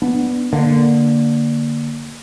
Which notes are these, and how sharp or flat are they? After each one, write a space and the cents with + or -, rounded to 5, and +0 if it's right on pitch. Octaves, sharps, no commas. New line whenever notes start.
B3 +0 D4 +0
D3 +0 A#3 +0